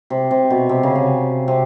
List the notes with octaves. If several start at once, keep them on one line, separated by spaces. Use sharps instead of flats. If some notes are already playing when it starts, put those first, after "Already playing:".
C3
C3
B2
C3
C#3
C3
C3